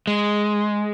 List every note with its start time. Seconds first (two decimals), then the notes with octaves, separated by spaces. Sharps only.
0.07 G#3